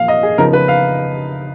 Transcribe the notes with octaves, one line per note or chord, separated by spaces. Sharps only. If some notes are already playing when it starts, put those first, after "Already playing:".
Already playing: A#2 F3 A#3 F5
D#5
G#4
C#3 F3 B3 D#4 A#4
B4
F5